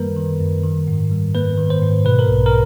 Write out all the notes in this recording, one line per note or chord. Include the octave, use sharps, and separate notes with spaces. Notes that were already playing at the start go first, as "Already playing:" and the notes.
Already playing: F#2 D#3 G3 A#3 A#4 B4
D#3
F#2
D#3
G#2
G3
A#3 B4
D#3
C5
G#2
B2 B4
A#4
B1
A#4